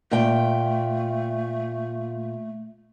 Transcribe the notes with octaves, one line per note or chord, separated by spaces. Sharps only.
A#2 A3 G5